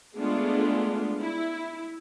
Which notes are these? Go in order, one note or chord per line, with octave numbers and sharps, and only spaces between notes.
G#3 A3 B3 D4 F4 G#4
E4